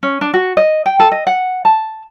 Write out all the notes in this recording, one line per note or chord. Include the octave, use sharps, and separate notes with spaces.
C#4
D4
F#4
D#5
G5
A4
D#5
F#5
A5